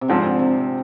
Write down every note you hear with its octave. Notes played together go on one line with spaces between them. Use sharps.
C3
G#2 D3 F3 C4
C3